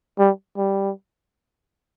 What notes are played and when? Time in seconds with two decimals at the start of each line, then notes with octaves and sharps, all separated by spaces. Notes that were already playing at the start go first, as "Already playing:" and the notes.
0.19 G3
0.57 G3